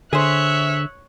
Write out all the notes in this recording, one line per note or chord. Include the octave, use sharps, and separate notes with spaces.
D3 G#4 C5 C#5 E5 F#6